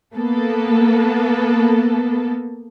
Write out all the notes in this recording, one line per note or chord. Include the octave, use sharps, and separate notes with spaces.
A#3 B3 A4